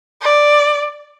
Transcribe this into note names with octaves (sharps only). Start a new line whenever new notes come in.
D5